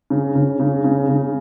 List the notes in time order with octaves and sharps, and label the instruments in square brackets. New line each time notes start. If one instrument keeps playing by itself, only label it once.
[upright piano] C#3
C#3
C#3
C#3
C#3